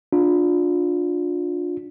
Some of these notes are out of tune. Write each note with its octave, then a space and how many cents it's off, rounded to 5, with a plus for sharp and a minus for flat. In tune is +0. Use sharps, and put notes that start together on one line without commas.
D4 +0 F4 +30